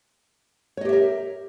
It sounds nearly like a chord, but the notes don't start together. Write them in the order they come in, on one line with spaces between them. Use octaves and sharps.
C#5 D#5 G4 E5 A#4